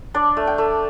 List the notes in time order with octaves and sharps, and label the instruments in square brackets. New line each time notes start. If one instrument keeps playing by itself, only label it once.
[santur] D4 D5
A3
G5
A3